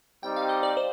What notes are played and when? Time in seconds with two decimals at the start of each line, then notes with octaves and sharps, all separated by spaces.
0.23 G3 C4 D#4 G4 G5
0.36 F5
0.49 D#5
0.63 D5
0.77 C5